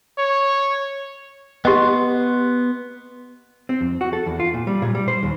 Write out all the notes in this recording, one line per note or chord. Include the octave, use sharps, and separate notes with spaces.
C#5
B3 G4 D#5 C6
C4
F2
F#4
A4
E2
F4
A#2
G3
A#2
G3
C5
D#2